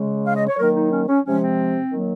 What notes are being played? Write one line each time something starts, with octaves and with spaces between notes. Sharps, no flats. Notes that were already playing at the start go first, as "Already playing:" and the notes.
Already playing: C#3 G#3
F5
D#5
C#5
D#3 F#3 A#3 A#4
D#4
C#4
C#4
C3 F3 G#3 C#4
C4
D#3 F#3 A#3